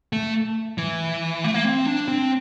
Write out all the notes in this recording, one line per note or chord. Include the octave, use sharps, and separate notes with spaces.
A3
E3
A3
A#3
C4
D4
C4